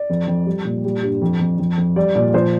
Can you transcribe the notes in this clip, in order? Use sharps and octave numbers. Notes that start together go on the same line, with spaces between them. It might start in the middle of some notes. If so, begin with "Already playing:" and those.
Already playing: D5
F2
F2
G3
A#2
G3
G2
F2
F2
F2
F2
G3 D5
A#2 D5
F3 C5